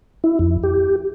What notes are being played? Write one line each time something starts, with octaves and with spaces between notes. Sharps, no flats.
E4
F2
G4